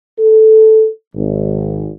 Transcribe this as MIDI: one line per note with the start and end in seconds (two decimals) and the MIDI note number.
0.19 0.88 69
1.15 1.88 32